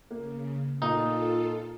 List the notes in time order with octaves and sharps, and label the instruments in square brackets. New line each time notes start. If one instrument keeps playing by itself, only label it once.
[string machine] C#3 [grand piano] A#3
[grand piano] A#2 [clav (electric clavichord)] D#4 [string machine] F4 A4